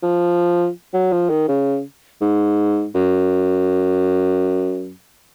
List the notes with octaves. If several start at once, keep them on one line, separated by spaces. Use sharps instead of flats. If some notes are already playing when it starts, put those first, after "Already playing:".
F3
F#3
F3
D#3
C#3
G#2
F#2